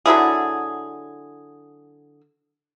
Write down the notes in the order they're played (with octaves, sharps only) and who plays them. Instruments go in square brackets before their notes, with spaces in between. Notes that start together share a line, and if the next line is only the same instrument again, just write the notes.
[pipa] D3 F#3 E4 G#4